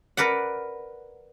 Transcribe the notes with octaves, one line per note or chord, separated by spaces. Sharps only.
A#4 B4 D5 F#5